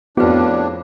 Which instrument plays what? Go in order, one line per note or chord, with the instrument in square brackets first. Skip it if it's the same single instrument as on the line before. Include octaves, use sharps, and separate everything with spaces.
[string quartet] F2 [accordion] A2 D4 [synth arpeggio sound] B3 E4 F#4 [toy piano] G#4 B4